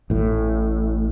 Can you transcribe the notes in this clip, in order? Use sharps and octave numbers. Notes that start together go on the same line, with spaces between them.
A1 A2